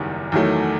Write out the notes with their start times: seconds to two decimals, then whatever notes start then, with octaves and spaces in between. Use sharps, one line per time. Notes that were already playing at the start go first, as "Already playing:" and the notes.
Already playing: F#1 E2 D#3 G3
0.32 E2 D#3 F#3 A3